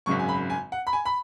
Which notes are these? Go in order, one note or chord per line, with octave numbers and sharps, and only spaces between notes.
G#1 F#2 C#3 F#3 C#6
G#5
B5
G#5
F#5
B5
G#5
B5